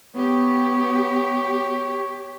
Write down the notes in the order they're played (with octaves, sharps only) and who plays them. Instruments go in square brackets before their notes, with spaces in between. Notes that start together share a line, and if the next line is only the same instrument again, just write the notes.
[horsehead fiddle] B3 [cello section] G4 [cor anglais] C#5